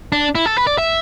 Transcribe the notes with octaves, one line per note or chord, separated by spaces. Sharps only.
D4
E4
A4
B4
D5
E5